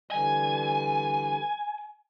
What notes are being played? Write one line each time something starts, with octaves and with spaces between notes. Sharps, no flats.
D3 E3 G3 G#5